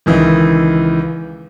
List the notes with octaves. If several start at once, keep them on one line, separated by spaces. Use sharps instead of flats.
C#2 D#3 E3